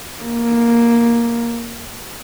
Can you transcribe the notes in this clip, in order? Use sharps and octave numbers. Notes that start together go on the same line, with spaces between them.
A#3